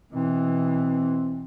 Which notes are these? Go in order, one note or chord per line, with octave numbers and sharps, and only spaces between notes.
B2 E3 C4